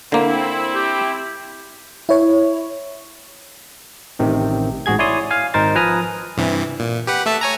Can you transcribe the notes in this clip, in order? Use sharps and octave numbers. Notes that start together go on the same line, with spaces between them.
D3 A#3 C4 E4
G4
E4 C#5
A1 C3 D#3
A1 G#2 F#4 G#4 G#6
E4 C#5 D5 G#5 C6 D#6
F5 G#5
G#1 D#4 A#4 C5 A6
F3 B4 G#5 A#5 D#6 F6
G2 C3 E3
A#2
G4 B4 F#5
A3 E5 A5
C#5 G#5 A#5